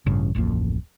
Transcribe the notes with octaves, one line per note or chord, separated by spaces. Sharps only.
A1 G2 C#3
D1 A1 F2 A#3